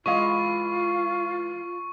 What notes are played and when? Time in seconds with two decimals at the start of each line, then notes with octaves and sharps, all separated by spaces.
0.06 E3 G#3 F4 F5 C#6